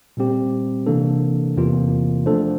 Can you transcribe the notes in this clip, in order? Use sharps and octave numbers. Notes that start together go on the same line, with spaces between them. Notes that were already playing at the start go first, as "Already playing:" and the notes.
A#2 G3 C4 G4
C3 E3 A#3 D4 A4
E2 C3 E3 A#3 F4
F3 A3 D4 A4 C5